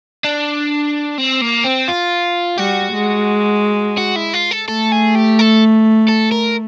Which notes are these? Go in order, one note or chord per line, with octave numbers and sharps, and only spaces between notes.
D4
C4
A#3
C4
F4
G3 F#4
G#3
F#4
E4
F4
A4
A3 A4
G#4
G4
A4
A4
A#4